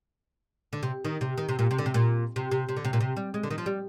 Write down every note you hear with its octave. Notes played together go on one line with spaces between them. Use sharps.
D3
C3
D#3
C3
D#3
C3
A#2
C3
D3
C3
A#2
C3
C3
C3
D3
C3
A#2
C3
G3
G#3
D3
D#3
F3
G3